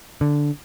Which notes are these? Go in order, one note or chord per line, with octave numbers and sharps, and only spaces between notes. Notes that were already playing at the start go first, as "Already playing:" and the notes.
D3